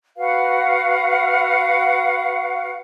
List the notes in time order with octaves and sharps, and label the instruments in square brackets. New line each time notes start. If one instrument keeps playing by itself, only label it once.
[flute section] F#4 B4 F5 F#5